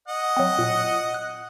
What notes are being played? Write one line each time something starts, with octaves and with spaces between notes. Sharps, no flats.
D#5 F#5
F#3 C4
A#2
F#6